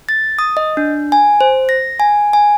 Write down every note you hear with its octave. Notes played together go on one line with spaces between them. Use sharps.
A6
D#6
D#5
D4
G#5
C5
A#6
G#5
G#5